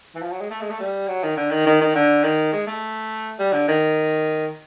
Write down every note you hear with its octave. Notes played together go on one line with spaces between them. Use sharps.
E3
F3
F#3
G#3
A3
G#3
A3
G3
F#3
D#3
D3
D#3
D#3
D#3
D3
D#3
G#3
A3
G3
D3
D#3